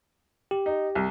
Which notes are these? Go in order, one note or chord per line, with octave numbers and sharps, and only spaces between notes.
G4
D#4
C2